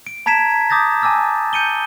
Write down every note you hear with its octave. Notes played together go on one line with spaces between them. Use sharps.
D7
A5 A#5 G#6 B6 D7 E7
D6 D#6 G6 A6 A#6
G#5 A5 D6 E6 A6
G6 C#7 D#7 G7